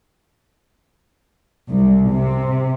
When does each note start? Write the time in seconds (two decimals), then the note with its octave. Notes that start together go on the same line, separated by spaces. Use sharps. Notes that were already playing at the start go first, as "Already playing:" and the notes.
1.69 C2
2.11 C3